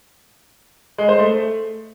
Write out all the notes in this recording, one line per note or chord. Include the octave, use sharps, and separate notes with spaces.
G#3
C5
A3